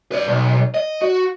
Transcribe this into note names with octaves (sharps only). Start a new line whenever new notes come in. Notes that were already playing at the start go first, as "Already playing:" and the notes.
B4 D5
B1
D#5
F#4